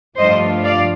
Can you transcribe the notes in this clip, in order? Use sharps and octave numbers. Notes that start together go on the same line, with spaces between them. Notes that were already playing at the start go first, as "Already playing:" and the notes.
G2 F3 A3 D4 F4 C5 D#5
D5 F5